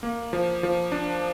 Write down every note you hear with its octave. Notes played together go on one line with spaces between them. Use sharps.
A#3
F3
F3
D4